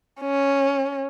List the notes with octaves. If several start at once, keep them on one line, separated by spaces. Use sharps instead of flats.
C#4